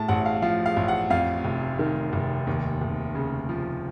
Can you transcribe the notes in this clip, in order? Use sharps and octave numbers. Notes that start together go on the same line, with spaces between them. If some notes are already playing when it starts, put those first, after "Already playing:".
Already playing: A2 A5
A1 F#5
F5
F3 F5
F5
A1
F#5
F2 F5
F1
D#3
F1
D#2
F1
C#3
F3